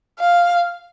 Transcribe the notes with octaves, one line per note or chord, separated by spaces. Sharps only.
F5